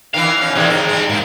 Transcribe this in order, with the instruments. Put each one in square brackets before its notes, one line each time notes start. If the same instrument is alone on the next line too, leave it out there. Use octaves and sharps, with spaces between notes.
[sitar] D#3 E3 E4 [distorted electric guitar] F5
[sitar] B2 C#4
[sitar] E2 C3 D#3 [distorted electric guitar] G#4 A#4
[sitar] D#4
G3 G#3
[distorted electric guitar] G#2 [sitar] A#3 D#4